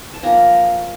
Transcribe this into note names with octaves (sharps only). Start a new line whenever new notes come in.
A5
F3 A#3 G#5 A#5